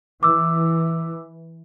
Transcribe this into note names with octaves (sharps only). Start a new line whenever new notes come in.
E3 D6 E6